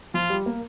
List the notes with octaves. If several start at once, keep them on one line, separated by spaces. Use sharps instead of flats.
F3 F4
G3
A#3